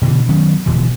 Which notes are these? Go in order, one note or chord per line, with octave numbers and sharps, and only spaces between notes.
B2 D3 E3
D#3 F#3 B3 C#4
D1 B2 E3 F3